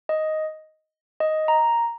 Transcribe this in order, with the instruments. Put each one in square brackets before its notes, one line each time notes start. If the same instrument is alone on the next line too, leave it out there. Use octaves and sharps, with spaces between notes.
[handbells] D#5
D#5
A#5